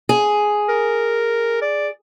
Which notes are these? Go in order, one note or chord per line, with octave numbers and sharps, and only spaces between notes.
G#4
A#4
D5